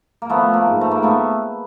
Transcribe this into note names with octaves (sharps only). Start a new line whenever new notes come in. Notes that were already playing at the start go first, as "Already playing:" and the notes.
A#3
F3 A3 B3
A#3
G#2
A3
A#3
A3 B3